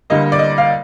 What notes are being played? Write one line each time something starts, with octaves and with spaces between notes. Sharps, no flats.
D2 D3 G3 A#3 D#5
D5
D#5
F5